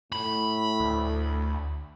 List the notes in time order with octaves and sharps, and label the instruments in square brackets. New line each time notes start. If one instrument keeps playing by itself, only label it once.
[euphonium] A2 [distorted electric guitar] B5
[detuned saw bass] D2